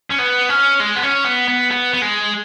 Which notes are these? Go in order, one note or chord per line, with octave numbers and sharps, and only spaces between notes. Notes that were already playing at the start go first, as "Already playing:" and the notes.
C#4
B3
C#4
G#3
B3
C#4
B3
B3
B3
B3
G#3